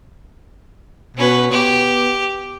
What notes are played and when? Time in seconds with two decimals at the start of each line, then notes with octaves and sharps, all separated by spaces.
1.17 B2 C#4 B4
1.52 B3 G4